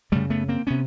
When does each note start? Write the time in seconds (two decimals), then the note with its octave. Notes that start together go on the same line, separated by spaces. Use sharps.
0.12 F#2 C#3 G3 A3
0.30 A3 B3
0.49 A#3 C4
0.67 C3 B3 C#4